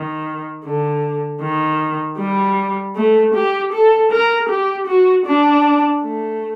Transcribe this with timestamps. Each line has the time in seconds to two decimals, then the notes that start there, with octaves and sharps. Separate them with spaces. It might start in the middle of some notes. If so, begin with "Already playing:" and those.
Already playing: D#3
0.65 D3
1.42 D#3
2.19 G3
2.96 A3
3.35 G4
3.73 A4
4.11 A#4
4.49 G4
4.87 F#4
5.26 D4
6.03 A3